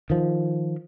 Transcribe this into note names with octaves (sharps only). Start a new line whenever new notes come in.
D#3 F3